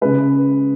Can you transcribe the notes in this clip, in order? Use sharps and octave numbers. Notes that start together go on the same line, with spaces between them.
C#3 G#3 B4